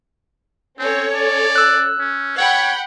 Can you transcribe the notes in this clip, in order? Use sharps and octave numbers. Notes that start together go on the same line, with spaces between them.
C4 C#4 A4 C#5
D5
E6 F#6
C#4
C#5 F#5 G5 B5